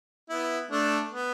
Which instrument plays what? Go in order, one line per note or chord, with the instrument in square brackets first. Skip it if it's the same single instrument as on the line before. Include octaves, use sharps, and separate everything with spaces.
[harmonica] B3 E4
A3 D4
B3